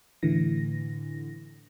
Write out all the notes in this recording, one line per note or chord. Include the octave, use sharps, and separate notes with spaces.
A2 D3 E3 A#6